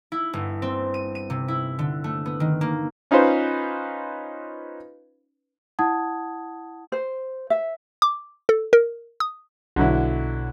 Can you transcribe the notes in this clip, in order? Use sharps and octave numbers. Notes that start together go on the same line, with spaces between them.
E4
G1
C4
D#7
D#7
C3
E4
D3
A3
B3
D#3
A#3
C#4 D#4 F4 B4 C5
E4 F#5 A5 D#6 G#6
C5
E5
D6
A4
A#4
D#6
B1 B2 D3 F#3 E4